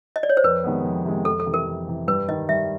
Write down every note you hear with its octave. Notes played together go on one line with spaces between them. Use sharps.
D#5
D5
C#5
C5
F2 B4
C3 D#3 G#3 B3
F2
C3 D#3 G#3 B3
F2 A4
A4
C3 E3
A#4
F2
C3 E3
G2 B4
D#3 G3 D#5
G2 E5